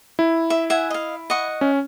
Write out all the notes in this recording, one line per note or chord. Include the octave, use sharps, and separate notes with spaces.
E4
E5
E5 F#5 G#5
D#5 F5
D#5 F#5 C#6
C#4